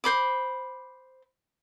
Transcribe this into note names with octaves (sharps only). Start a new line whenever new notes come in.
C5 B5 D6